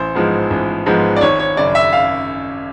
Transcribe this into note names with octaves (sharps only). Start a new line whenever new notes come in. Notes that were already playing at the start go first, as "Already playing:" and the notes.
Already playing: A1 C5
G#2 F3 G#3 B3
A1
G#2 F3 G#3 B3
D5
G#1 C#5
C#5
F#2 C#3 D5
E5
F5